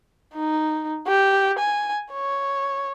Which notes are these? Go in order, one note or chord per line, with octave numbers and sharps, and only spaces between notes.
D#4
G4
G#5
C#5